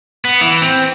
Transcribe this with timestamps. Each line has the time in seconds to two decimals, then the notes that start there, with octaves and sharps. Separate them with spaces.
0.25 B3
0.41 E3
0.62 C4